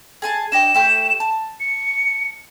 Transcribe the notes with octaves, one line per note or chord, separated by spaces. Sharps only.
G#4 G#5 A5
D4 D#5 G5 E7
A3 G4 G6
A5
C#7